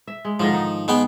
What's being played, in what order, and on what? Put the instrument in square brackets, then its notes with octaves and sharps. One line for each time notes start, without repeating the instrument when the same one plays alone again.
[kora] E5
G#3
[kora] G#2 D3 D#3 [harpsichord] F3
[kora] D#4
[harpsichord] G#3 B3 G5